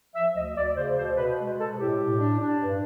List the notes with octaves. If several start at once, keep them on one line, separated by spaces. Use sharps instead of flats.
F3 E5
D2 D#5
D2 D5
C#3 C5
B2 C5
B2 B4
G#3
B2 A4
A2 G4
A2
D4
D4
G2